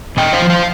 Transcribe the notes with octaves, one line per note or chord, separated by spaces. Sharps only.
A#2 D#5 G5
C5 F5
F3
C5 F5